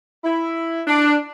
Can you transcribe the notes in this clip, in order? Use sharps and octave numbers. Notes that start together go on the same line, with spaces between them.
E4
D4